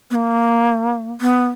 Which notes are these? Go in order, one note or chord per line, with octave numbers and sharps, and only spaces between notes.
B3
A#3
B3